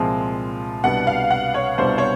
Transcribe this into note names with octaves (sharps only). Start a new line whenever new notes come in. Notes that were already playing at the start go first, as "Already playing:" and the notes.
Already playing: C2 A#2 F3 G#3 C4
C2 B2 G3 B3 D4 F#5
F5
F#5
C#5
C2 B2 G3 B3 D4 C5
C#5